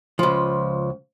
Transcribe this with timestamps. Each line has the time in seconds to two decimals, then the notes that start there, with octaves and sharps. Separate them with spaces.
0.19 C#2 F3